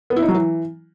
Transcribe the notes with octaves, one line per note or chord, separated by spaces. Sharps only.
B3
E4
D#4
F#3
E3